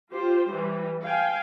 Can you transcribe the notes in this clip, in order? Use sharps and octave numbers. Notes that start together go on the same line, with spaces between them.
F4 G4 C5
E3 G3
F5 G5 G#5